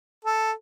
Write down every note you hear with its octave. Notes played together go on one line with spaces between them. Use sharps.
A4